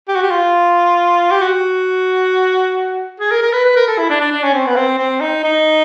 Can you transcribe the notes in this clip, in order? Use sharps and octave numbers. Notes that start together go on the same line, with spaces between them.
G4
F#4
G4
F4
G4
F#4
G#4
A#4
A#4
B4
B4
A#4
A4
E4
D4
D4
D4
C#4
C4
B3
C4
C4
D#4
D#4